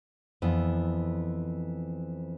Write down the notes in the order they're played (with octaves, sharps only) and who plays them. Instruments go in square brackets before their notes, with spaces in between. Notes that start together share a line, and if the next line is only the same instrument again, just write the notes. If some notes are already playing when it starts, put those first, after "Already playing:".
[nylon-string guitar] F2 E3 B3